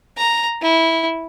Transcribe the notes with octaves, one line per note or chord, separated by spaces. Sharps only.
A#5
E4